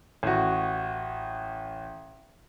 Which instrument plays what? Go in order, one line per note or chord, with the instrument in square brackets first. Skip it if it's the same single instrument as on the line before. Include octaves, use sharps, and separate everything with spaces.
[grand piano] A1 F#4